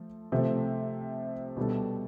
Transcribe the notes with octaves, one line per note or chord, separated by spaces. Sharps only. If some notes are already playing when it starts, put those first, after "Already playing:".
Already playing: F3 A3
C3 F3 A3
B2 G3 D4 A4